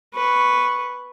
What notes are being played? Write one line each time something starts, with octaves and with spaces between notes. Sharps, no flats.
B4 C#6